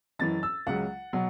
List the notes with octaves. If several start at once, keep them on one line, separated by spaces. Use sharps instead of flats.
F#1 F#2 E3 A6
E6
C#2 C#3 F#3 F#5
B2 F#3